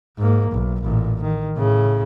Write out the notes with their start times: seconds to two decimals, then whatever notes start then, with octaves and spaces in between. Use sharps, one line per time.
0.18 G#2 A#3
0.51 B1
0.82 A1 A#2
1.23 D#3
1.57 A2 C#3